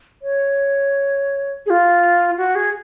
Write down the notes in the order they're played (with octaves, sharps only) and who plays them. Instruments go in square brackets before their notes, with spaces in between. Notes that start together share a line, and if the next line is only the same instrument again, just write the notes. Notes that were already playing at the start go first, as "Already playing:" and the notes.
[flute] C#5
G#4
F4
F#4
G#4